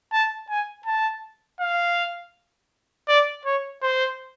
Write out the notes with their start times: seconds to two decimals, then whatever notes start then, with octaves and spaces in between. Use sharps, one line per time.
0.12 A5
0.50 G#5
0.86 A5
1.60 F5
3.08 D5
3.45 C#5
3.82 C5